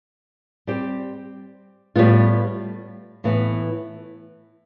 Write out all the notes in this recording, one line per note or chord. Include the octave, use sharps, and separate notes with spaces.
G3 C4 G4
A2 G3 B3 F4
A2 E3 B3